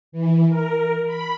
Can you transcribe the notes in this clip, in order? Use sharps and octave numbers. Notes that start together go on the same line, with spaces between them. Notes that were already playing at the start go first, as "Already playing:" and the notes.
E3
A#4
B5